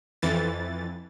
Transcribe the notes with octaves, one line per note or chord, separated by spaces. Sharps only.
F2 E3 A6